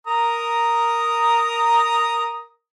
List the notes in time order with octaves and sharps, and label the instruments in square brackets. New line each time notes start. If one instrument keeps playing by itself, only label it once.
[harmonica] A#4 A#5 D#6